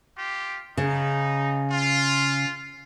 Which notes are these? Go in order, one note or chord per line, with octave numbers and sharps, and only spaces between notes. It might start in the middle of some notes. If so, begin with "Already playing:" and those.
F4 G4
C#3 D#4
F4